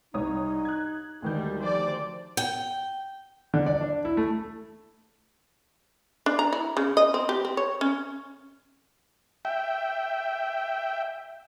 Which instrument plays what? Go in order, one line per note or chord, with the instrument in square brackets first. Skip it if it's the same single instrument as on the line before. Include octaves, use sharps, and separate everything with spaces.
[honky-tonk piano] C2 C#5 D#6 [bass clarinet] D#4
[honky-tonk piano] F#6 G#6
[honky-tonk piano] D2 D#3 G6 [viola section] G3 [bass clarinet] G#3
[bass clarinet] F3 [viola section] C5 D5
[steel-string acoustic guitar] G5
[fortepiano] D3
D5
D4
E4
A3
[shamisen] D4
A#5
E4
C#3
D#5
C4
G4
C4
C#5
C#4
[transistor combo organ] E5 G5